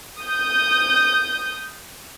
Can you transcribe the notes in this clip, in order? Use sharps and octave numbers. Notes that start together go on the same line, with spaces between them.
D#6 G6